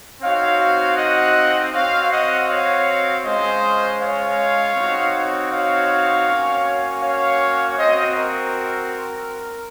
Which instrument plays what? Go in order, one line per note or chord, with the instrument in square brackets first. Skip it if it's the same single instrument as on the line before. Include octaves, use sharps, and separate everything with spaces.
[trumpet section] C4 D#4 F#4 C#5 F5
D#5 F#5
C4 F#4 C#5 F5
D#5 F#5
C#5 F5
G#3 C#4 F4 C5 D#5
C#5 F5
C4 D#4 F#4
C#5 F5
A#3 C#4 F#4
C#5 F5
C4 F#4 C5 D#5
A#4